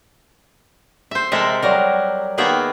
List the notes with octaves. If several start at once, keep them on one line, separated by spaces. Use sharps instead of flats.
C5 E5
C3 G#3 A4 A#4 E5
F#3 G3 A#4
D#3 A#3 B3 G#4 E5 G5